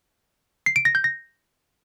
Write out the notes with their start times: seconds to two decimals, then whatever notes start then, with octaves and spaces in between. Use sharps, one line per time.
0.66 C7
0.76 D7
0.85 A#6
0.95 G6
1.04 A#6